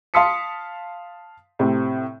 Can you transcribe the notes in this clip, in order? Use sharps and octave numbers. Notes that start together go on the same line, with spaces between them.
F5 A5 C6 D#6 B6 C#7
A2 C3 C4